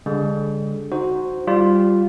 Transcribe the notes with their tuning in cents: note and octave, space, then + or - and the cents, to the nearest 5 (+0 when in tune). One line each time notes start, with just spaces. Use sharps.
D3 -30 G#3 -40
D#4 +0 F#4 +0 C5 +0
G3 +0 F4 +0